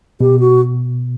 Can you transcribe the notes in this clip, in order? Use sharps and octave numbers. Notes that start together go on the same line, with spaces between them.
B2 G4
F#4